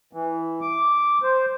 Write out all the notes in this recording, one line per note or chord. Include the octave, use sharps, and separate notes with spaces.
E3
D6
C5